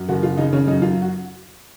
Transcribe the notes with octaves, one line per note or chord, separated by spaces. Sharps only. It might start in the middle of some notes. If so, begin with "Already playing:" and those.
Already playing: F#2
F#1 F#4
F#1 F4
C#3 D#4
C#3 C#4
F#2 D#4
F#2 F4
F#4